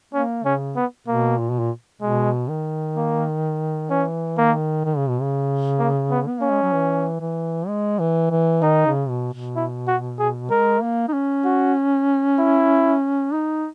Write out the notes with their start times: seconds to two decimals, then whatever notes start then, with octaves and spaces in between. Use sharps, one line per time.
0.14 A#3 C#4
0.44 C#3 C#4
0.76 B3
1.07 B2 A#3
1.38 A#2
1.50 B2
1.59 A#2
2.01 B2 G#3
2.49 D#3
2.96 A#3
3.90 E3 C#4
4.38 D#3 A#3
4.85 D#3
4.97 C#3
5.09 B2
5.21 C#3
5.79 A#3
6.10 B3
6.28 B3
6.39 A#3 C#4
6.50 G#3
6.62 F#3
6.73 E3
7.21 E3
7.68 G#3
7.99 E3
8.30 E3
8.62 D#3 D#4
8.86 C#3
9.09 B2
9.33 B2
9.56 E4
9.87 F#4
10.19 G#4
10.50 G#3 A#4
10.82 A#3
11.08 D#4
11.13 C#4
11.45 F#4
12.39 E4
13.33 D#4